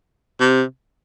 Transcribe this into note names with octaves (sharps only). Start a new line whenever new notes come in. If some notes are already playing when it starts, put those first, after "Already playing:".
C3